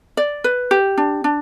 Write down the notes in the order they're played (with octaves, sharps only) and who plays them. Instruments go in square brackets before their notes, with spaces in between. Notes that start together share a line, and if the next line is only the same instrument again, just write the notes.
[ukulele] D5
B4
G4
D4
D4